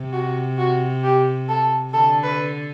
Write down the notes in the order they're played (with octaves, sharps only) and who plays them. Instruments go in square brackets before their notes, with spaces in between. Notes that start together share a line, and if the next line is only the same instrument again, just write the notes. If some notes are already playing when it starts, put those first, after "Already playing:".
Already playing: [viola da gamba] C3
[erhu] F#4
F#4
G4
A4
[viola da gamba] D3 [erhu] A4
[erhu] B4